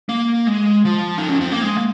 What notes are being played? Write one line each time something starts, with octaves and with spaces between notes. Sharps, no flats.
A#3
G#3
F3
D#4
C#4
C4
A#3
G#3
A#3